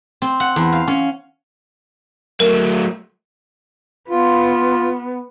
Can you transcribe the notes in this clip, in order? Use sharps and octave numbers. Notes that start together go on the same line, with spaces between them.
C4
F#5
E2
F5
C#4
F#3 A3 A#4
B3 F4